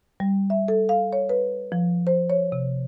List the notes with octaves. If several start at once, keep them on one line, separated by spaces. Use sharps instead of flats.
G3
E5
A4
F5
C#5
B4
F3
C5
C#5
C3